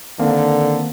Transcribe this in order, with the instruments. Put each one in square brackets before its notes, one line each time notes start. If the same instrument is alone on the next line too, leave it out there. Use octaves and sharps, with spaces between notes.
[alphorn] D3 [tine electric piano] D#3 A#3 C4